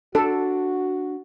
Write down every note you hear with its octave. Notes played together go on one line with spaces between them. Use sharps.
D4 F#4 A4